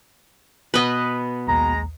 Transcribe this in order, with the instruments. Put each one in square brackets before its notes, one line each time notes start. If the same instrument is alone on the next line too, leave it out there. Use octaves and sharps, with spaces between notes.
[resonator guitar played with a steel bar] B2 B3 [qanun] B4 D#5
[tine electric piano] A#1 D#2 [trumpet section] G#3 A#5